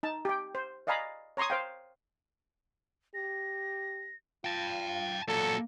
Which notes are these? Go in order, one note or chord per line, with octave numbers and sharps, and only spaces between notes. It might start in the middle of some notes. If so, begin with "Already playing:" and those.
D#4 A5
G4 G5
C5
D5 D#5 F5 G#5 A#5 B5
C#5 A#5 C6 C#6 D#6
C5 F5 G5
G4 A#6
F4 G5 A5
F5
A#2 F#3 A4 C#7